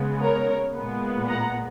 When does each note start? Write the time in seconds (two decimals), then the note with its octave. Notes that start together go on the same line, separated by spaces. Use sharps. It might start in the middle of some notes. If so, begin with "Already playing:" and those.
Already playing: C#3 G#3 B3
0.21 A#4 C#5
0.75 A#2 G#3 B3
1.29 F#5 A#5